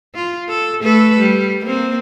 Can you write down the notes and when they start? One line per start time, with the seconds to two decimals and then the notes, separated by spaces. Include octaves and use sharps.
0.15 F4
0.49 A4
0.81 A3 A4 B4
1.20 G3
1.65 A#3 C4